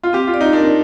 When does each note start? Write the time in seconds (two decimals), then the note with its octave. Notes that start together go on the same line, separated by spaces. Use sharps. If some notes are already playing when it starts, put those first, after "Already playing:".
0.03 F4
0.13 C4 G4
0.27 F4
0.34 D5
0.41 D#4
0.53 D4 A#4